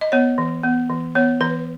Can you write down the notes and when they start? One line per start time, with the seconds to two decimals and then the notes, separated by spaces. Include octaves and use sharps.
0.01 D#5
0.12 B3 C#5
0.38 E3
0.63 B3
0.90 E3
1.15 B3 C#5
1.40 E3 B4